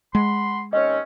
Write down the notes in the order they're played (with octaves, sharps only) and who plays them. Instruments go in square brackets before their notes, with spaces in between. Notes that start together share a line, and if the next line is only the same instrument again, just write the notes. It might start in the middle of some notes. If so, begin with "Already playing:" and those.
[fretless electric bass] G#3 [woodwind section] F#5 B5 C6
[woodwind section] D#2 C4 C#4 [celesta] C#5 D#5